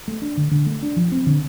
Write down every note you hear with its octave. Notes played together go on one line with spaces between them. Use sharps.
A3
D4
D3
D3
A3
D4
F3
C4
D3